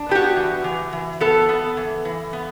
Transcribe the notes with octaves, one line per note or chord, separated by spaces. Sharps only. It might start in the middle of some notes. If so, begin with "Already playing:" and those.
Already playing: D4
B3 G4
F#4
E3
E3
E3
B3 A4
B3
E3
E3
B3